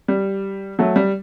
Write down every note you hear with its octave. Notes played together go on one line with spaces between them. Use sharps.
G3
F#3 A3
G3